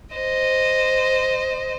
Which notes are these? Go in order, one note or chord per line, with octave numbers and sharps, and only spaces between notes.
C5 D#5